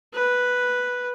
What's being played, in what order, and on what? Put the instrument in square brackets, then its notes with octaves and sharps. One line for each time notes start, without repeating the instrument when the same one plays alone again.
[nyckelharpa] B4